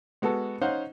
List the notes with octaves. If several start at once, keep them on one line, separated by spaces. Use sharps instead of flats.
G#3 B3 F#4 A4
C#4 D#4 C5 F5 F#5